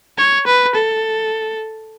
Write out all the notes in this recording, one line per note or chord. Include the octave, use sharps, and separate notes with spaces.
C#5
B4
A4